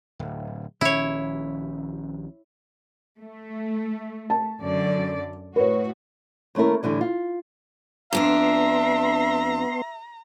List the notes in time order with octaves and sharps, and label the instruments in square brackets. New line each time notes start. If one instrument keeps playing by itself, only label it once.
[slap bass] D1
[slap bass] A#1 D#3 C#4 [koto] E4 C#5
[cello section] A3
[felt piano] A5
[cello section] F#2 D3 D5
[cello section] A2 F#4 [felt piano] B4 C#5
[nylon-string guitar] D#2 A3 C#4 E4 A#4
A2 D3 E3 G3
F4
[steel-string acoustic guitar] F2 D4 F4 [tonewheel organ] B3 C6 [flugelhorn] E5 [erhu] A#5